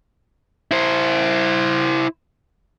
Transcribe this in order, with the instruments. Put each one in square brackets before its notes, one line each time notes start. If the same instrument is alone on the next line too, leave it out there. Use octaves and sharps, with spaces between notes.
[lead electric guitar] E4 C5